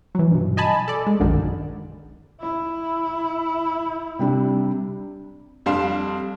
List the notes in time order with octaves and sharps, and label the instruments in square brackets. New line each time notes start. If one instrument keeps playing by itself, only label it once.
[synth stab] E3 F#3
G2 B2
D#5 G#5 A5 B5
A4 D5
G#3
A#1 F#2 D3 D#3
[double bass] E4
[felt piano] C3 G3 D4
[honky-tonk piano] F2 G3 D4 F5 C6 E7